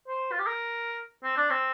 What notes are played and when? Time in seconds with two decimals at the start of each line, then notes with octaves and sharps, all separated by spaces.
0.08 C5
0.32 F4
0.39 G4
0.47 A#4
1.24 C4
1.37 D4
1.50 C4